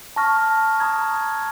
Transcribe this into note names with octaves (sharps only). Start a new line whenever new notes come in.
A5 C#6 F6 A#6
A#5 D#6 G#6